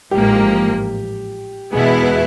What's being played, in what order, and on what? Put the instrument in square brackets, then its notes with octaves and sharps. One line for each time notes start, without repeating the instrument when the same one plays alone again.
[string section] A1 G#2 F3 A#3 [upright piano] G4
[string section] E2 B2 G#3 B3 E4 [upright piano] G#4
[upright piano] B4